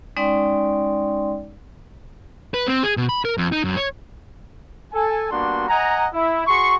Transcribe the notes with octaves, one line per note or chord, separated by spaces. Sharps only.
G#3 C#4 D#4 D5 G5 C6
B4
C4
G#4
B2
B5
A#4
F2
D#4
F#2
C#5
A4 G#5
G3 A#3 B3 D4 F#4 C6
D#5 F#5 G#5 A#5
E4
F#4 G#4 C6 C#6